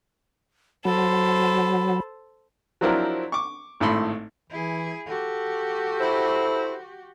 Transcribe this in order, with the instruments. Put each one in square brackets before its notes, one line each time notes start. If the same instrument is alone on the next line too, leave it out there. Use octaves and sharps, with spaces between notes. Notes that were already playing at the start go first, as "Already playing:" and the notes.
[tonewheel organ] F#3 [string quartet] A4 C5 [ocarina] B5
[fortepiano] F3 F#3 C4 D4 E4 A#4
C#6 D6
G#1 A2 A4 B5 C6
[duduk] E3 [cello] E4 G#4
[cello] F#4 G4 [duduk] A4
[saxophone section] E4 C5